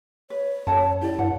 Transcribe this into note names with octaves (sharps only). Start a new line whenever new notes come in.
B4 C#5
F#2 A4 F#5 A5
E4 G4 D5
G2 F#5